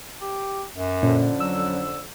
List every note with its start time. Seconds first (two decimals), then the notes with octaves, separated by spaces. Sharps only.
0.21 G4
0.75 F#2
1.03 F2 A#2 D3 C#4
1.40 F#3 E6